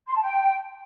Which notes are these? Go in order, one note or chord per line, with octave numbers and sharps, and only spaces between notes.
C6
A5
G5